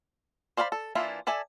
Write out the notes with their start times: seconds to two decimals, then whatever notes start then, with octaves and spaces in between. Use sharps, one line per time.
0.57 C5 D5 F5 G5 B5
0.72 A4
0.95 E3 A#3 D4 E4 F4
1.27 A4 D5 E5 G#5